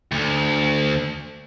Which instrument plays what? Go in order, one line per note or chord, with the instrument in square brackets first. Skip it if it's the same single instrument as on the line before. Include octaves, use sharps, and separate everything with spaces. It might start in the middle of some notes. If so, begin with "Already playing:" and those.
[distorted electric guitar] D2